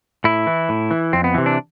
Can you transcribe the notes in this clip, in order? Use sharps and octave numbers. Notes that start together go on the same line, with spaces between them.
A2 E4
E3
A2
E3
F2 C4
B3
C3 E3
D4